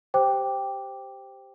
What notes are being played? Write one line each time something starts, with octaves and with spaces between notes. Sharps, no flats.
G4 C5 G5 D6